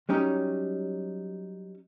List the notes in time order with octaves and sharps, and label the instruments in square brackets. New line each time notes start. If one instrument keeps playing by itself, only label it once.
[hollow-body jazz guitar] F#3 G3 C#4 D#4 G4 C#5